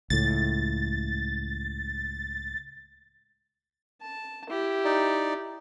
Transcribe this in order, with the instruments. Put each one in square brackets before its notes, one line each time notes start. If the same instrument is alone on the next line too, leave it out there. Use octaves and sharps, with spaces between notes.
[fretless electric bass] C#2 A2 [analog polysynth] A6
[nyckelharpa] A5
E4 G4
[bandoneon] D#4 D5